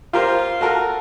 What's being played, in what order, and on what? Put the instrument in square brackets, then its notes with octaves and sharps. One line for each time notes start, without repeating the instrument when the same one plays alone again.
[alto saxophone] F4 [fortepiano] G4 A#4 C5
[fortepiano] F#4 A4 A#4